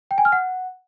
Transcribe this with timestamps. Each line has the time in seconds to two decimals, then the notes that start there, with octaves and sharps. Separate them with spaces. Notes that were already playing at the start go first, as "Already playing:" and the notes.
0.11 G5
0.18 G#5
0.25 F6
0.32 F#5